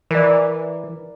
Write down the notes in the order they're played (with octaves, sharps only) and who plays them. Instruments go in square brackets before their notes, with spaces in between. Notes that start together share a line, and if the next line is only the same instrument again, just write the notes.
[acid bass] E3 [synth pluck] A#4 D5